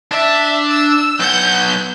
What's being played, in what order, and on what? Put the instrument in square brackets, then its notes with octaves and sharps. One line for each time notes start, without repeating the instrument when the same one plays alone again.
[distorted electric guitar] D4 [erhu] E5
[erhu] E6
[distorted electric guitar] B1 F#5 [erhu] G6